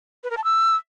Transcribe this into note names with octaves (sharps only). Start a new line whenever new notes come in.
B4
A#4
A5
E6